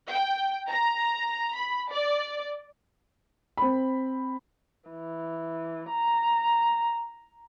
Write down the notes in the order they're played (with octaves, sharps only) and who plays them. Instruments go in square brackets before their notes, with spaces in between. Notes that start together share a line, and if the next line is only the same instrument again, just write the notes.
[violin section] G5
A#5
B5
D5
[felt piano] C4 B5
[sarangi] E3
A#5